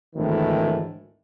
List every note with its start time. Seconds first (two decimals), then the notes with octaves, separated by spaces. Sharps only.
0.16 G#1 D2 A2 D#3 E3